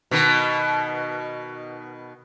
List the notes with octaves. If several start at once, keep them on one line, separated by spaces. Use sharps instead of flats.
B2 D#3